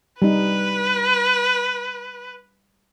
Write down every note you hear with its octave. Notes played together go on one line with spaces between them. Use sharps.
G3 D#4 B4